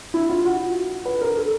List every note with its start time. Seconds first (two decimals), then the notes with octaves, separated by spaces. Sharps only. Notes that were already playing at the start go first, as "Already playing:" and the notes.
0.14 E4
0.30 F4
0.45 F#4
1.05 B4
1.22 A#4
1.36 A4